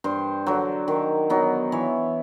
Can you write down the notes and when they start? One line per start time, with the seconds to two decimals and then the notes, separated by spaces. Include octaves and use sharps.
0.04 G2 C5
0.47 D3 F#3
0.88 D#3
1.30 F#3 B3 D#4
1.72 E3 C#5